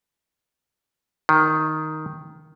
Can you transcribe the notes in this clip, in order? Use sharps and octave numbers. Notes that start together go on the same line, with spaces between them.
D#3